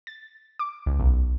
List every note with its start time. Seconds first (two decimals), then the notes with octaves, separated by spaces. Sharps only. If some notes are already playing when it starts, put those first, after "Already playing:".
0.07 A6
0.59 D6
0.86 C#2
1.00 B1